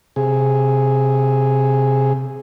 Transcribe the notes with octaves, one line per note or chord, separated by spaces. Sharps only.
C3 G#4